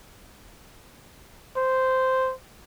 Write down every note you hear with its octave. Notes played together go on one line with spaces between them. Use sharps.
C5